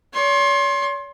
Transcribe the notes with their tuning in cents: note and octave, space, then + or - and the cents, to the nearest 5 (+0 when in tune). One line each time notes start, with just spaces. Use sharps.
C#5 +40 C6 +25